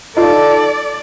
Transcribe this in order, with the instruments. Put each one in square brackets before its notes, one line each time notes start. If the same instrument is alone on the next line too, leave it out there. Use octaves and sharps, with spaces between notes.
[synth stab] D#4 F4 [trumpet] A4 [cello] D5